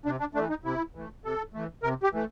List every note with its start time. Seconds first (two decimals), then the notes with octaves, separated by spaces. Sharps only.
0.05 C3 D4
0.20 D4
0.35 A3 D4
0.38 E3
0.50 D#4
0.64 C3 E4
0.95 E3 A3
1.24 C3 A4
1.54 E3 A3
1.83 C3 A#4
2.03 G4
2.12 E3 A3